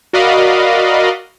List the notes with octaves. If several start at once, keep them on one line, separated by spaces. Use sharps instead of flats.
F#4 A#4 D5 D#5 F5 B5